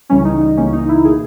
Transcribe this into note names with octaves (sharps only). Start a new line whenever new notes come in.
C#2 C#3 E3 G3 C#4
D#4
D#4
C#2 C#3 E3 A#3 C#4
D#4
E4
B2 A#3 G#4